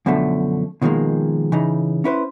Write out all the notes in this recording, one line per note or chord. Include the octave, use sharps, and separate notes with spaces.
F#2 B2 D3 F3 A3
B2 D#3 F3 G#3 A#3
C#3 E3 D#4
C#4 E4 B4 C5